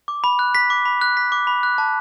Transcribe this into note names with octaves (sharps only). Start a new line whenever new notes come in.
D6
B5
F#6
B6
D6
B5
F#6
B6
D6
B5
F#6
A5